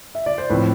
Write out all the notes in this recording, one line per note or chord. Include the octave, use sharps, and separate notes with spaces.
E5
D5
C5
A2 F3 C4 B4